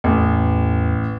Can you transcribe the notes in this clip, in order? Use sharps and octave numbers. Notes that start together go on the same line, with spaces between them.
A1 E2